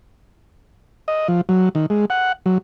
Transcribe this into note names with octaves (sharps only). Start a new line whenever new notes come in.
D#5
F3
F#3
D#3
G#3
F#5
F#3